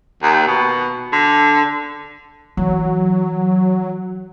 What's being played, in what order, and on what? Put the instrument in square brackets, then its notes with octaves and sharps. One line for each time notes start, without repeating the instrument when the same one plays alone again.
[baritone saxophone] D#2
B2
D3
[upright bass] E3 [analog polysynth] F#3